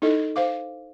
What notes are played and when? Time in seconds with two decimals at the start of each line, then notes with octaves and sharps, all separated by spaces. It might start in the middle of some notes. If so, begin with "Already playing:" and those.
0.02 D#4 E4 A4 D#5
0.36 C5 F5 D6